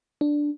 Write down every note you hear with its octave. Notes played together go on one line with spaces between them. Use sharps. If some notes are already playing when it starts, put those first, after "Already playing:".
D4